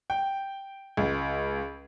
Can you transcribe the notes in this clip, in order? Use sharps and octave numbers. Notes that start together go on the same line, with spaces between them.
G5
C#2